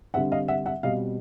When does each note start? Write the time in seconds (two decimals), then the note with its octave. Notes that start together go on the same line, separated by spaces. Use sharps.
0.14 D3 G3 C4 E5 F#5
0.32 D#5 F5
0.48 E5 F#5
0.66 E5 F#5
0.83 B2 G3 C4 D#5 F5